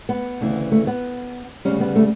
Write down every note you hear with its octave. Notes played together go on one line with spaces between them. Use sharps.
B3
D2 C#3 E3
A3
B3
D2 C#3 G3 C#4
B3
A3